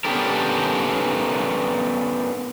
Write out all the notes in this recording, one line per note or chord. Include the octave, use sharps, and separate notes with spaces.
B3 C#4 D4 G4 A4 A#4